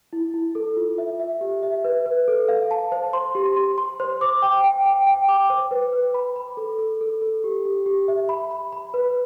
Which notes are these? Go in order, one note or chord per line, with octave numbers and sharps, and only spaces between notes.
E4
E4
A4
F4
E5
E5
G4
E5
B4
B4
A4
F5
A5
C5
C6
G4
C6
C6
C5
D6
G5
G5
G5
G5
D6
C5
B4
B4
B5
B5
A4
A4
A4
A4
G4
G4
G4
E5
B5
B5
B5
B4